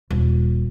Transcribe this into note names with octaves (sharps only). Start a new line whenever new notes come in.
D#1